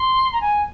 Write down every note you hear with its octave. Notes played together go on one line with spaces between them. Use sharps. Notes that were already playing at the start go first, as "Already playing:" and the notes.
Already playing: C6
A#5
G#5